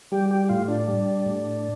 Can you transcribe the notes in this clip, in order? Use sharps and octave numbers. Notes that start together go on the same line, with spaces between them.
G3 G4
G4
A2 F4
D4
G3
A2